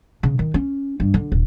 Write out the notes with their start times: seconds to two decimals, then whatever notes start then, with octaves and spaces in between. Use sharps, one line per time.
0.23 C#3
0.39 D#3
0.54 C#4
1.00 G2
1.14 D3
1.32 D#1